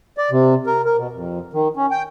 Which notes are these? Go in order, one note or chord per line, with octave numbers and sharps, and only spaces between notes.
D5
C3
A#4
A#4
B2
F2
D#3
C#4
G5